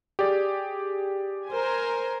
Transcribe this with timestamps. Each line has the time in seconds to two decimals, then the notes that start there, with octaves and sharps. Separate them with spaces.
0.19 G4 G#4 D5
1.48 A#4 C5 G#5